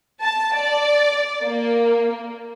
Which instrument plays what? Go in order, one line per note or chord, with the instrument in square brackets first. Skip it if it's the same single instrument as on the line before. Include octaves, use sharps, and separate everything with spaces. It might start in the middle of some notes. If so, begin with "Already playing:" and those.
[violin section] A5
D5
A#3